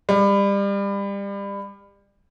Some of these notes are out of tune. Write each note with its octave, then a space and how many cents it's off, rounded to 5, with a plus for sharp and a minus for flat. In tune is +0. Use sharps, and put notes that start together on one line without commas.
G3 +30